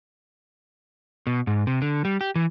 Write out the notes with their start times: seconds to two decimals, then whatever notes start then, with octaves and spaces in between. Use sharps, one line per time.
1.27 B2
1.47 G#2
1.67 C3
1.82 D3
2.05 G3
2.21 G4
2.35 E3